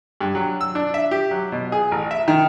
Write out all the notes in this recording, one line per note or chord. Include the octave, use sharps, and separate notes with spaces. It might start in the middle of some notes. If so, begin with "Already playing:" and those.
G2
F#3
E6
D4
E5
G4
F#3
B2
G#4
A1
E5
D#3